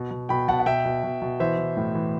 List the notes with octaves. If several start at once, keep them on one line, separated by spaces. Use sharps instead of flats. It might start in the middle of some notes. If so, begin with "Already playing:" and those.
Already playing: B2
B2
B2 G5 B5
B2 F#5 A5
F#5
B2 E5 G5
B2
B2
B2
E3 C5 E5
E3
A2
E3